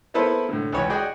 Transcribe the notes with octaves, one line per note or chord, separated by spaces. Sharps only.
A#3 B3 E4 A4 B4 C5
A2 D3
C#2 E3 C#5
F#4 G#4 D5 D#5 F#5 G5